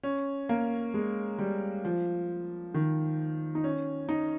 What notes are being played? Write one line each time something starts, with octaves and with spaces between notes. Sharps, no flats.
C#4
A#3
G#3
G3
F3
D#3
D#4
C#4
D#4